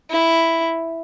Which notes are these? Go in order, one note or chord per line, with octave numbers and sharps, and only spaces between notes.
E4